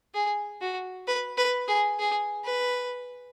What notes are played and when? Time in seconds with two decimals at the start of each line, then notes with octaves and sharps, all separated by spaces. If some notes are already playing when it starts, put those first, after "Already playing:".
0.14 G#4
0.61 F#4
1.07 B4
1.38 B4
1.68 G#4
1.99 G#4
2.45 B4